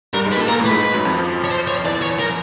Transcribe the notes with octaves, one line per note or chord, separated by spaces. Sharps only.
G2 G3 A#4
G#2 G#3
B4
A#2 A#3
A4
A#2 A#3 A#4
A2 A3
B4
G#2 G#3
G#2 G#3
F#2 F#3
F2 F3
F2 F3
C#5
C5
C#5
E2 E3 D5
C#5
A#4